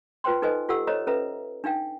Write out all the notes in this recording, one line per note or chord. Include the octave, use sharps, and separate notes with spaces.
F4 B4 C5 G5 C6
D#4 A4 B4 C5 D#5 G#5
F4 G4 A4 F#5 E6
A4 C5 C#5 D#5 A#5
C#4 A4 B4 E5 A#5
D4 D#4 F5 G5